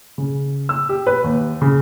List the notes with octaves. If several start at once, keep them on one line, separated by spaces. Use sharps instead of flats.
C#3
E6
G4
B4
D#2
C#3